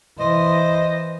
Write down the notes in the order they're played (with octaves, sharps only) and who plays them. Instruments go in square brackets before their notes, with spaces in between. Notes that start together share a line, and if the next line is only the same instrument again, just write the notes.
[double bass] E3 [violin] C5 [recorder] D#5